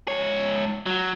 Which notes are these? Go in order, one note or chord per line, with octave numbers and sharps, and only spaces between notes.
G#2 C#5
F#3